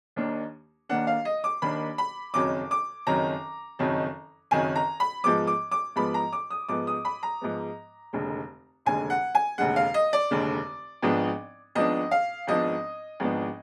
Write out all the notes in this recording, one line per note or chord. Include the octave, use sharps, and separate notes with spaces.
D#2 D#3 A#3 D4
D#2 D#3 A#3 D4 F#5
F5
D#5
D6
D#2 D#3 A#3 D4 B5
B5
F#1 F2 D#3 F#3 D6
D6
F#1 F2 D#3 F#3 A#5
F#1 F2 D#3 F#3
F#1 F2 D#3 F#3 G#5
A#5
B5
G#2 F3 G#3 B3 D6
D6
D6
G#2 F3 G#3 B3 B5
A#5
D6
D#6
G#2 F3 G#3 B3 D6
D#6
B5
A#5
G#2 F3 G#3 B3
F1 D#2 D3 G#3
F1 D#2 D3 G#3 G#5
F#5
G#5
F1 D#2 D3 G#3 F#5
F5
D#5
D5
F1 D#2 D3 G#3
G#1 G#2 F3 B3 D4
G#1 G#2 F3 B3 D4 D#5
F5
G#1 G#2 F3 B3 D4 D#5
G#1 G#2 F3 B3 D4